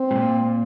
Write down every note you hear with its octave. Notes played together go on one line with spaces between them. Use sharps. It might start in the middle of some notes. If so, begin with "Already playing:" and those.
Already playing: C4
A2
A#2